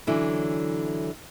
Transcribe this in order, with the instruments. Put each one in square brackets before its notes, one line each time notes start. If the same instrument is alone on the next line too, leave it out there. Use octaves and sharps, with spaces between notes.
[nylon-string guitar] D3 E3 F#3 C#4 E4